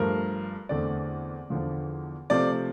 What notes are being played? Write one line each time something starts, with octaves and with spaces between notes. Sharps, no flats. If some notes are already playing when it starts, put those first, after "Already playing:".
Already playing: G2 F3 A3 A#4
E2 D3 A3 C4 D5
E2 D3 F3
C3 F3 A3 C4 D5